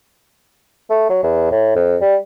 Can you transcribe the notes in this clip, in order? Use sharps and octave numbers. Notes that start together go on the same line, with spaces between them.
A3
F#3
E2
A2
F2
G3